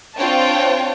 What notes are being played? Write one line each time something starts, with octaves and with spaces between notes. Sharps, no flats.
C4 D4 F4 C#5 G5 A5